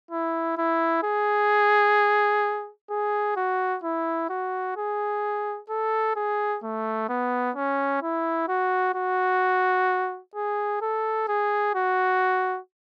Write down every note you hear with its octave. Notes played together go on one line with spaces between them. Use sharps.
E4
E4
G#4
G#4
F#4
E4
F#4
G#4
A4
G#4
A3
B3
C#4
E4
F#4
F#4
G#4
A4
G#4
F#4